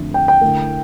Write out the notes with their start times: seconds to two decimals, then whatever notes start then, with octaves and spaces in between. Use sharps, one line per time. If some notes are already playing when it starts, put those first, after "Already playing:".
Already playing: F2 D3 A3 D4
0.14 G5
0.28 G5
0.41 D3 A3 E4 A#4